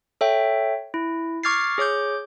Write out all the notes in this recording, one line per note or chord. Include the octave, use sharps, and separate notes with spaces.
A4 C#5 E5 G5
E4
C#6 D6 F6 G#6 A6 C7
G#4 C#5 D6 G6